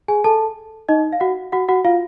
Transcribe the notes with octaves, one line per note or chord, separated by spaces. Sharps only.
G#4 G#5
A4 A5
D#4 D#5
F5
F#4 F#5
F#4 F#5
F#4 F#5
F4 F5